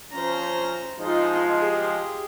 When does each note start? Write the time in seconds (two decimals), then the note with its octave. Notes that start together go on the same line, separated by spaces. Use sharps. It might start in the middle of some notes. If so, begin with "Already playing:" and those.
0.13 F3 C#4 C5 A#5
0.99 F3 G#3 D#4 F4
1.60 G4 G#4